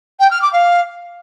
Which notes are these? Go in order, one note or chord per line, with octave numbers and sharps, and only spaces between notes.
G5
F6
D6
F5